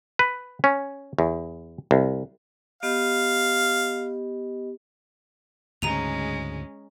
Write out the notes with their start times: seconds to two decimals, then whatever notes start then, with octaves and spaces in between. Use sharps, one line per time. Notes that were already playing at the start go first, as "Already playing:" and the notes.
0.19 B4
0.64 C#4
1.19 E2
1.91 C2
2.83 B3 G4 D#5 F5
5.82 D2 G#2 C#3 G#3 C#4 A#5 D#7 F7